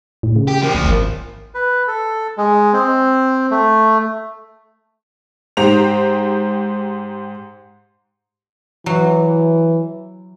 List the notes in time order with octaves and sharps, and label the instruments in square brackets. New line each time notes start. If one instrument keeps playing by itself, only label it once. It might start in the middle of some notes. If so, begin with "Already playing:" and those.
[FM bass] A2
C#3
[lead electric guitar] G4
F3 A#3
[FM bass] D2
G#1
[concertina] B4
A4
G#3
C4
A3
[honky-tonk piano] G#2 G4 C5 A#5 F7
[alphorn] E3 [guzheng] F#3